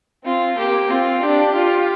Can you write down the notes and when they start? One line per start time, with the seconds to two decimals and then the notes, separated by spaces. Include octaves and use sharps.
0.24 C4 F4
0.58 A#3 G4
0.90 C4 F4
1.23 D4 G4
1.55 F4